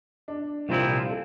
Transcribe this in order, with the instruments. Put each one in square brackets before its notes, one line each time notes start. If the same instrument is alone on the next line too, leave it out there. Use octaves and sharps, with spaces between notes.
[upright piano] D4
[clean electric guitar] C2 A#2 F3 C4 E4 [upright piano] F4
[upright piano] A4